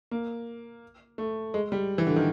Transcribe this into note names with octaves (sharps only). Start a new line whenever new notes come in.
A#3
A3
G#3
G3
E3
D3
D#3